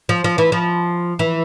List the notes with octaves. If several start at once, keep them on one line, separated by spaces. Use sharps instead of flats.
F3
F3
E3
F3
E3